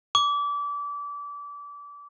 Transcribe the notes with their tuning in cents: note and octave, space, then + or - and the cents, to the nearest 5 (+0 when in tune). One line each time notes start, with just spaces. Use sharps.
D6 -30